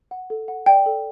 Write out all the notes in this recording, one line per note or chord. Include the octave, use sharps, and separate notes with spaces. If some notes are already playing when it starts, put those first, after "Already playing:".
F#5
A4
F#5
D5 G5
A4